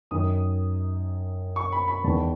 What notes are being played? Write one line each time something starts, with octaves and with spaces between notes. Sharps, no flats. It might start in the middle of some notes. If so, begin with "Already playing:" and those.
F#2 D#3 D#6
C#6
B5
B5
E2 D#3 A5